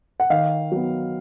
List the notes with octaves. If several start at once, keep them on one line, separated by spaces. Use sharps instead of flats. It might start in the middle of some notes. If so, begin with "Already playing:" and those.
F#5
D#3 F5
F#3 B3